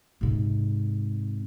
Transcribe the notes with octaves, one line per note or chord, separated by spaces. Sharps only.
G#2 C3